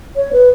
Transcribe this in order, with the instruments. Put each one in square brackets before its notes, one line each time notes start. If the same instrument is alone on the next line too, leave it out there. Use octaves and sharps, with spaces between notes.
[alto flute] C#5
B4